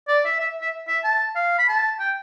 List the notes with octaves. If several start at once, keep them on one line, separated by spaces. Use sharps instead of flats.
D5
E5
E5
E5
E5
A5
F5
B5
A5
G5